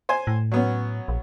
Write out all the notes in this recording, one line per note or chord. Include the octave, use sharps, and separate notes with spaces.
C5 G#5
A2
F#3 B3 C#4
A#1